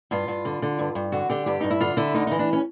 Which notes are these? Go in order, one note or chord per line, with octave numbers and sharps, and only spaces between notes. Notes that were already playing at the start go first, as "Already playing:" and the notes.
G2 F4
G2
D3
D3
G2
G2
D3 F#4
D3 G4
G2 G4
G2 D#4
E4
D3 F4
D3 E4
D2 D#4
E3 D#4
D4
C#4